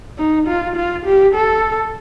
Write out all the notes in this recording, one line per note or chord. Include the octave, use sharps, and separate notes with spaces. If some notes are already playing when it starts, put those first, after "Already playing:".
D#4
F4
F4
G4
A4